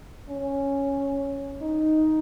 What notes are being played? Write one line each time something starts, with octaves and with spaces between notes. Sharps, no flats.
C#4
D#4